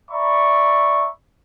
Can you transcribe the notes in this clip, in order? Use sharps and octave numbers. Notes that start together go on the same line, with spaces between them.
D5 E5 A#5 B5 C#6